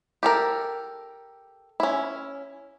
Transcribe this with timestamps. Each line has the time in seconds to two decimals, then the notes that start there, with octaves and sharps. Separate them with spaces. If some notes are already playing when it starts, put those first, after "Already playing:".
0.23 G4 A4 A#4
1.80 C#4 E4